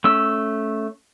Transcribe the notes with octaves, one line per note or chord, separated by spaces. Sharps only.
A3 C#4 E6